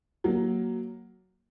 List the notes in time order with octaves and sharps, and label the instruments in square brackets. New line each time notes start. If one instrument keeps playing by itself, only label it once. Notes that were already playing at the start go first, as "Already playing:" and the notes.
[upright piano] F#3 A#3